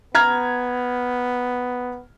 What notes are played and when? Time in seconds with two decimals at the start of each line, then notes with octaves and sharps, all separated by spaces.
0.15 B3 A#5 F6 G#6